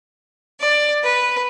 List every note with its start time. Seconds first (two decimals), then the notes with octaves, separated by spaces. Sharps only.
0.60 D5
1.02 B4